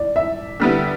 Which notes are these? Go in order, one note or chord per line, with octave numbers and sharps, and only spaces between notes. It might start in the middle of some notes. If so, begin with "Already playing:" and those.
Already playing: D5
E5
D3 G3 B3 E4